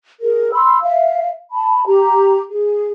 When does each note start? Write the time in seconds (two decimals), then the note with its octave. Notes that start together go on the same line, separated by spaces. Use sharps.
0.21 G#4 A#4
0.53 B5 C6 E6
0.83 E5 F5
1.52 A5 B5
1.86 G4 A#5
2.50 G#4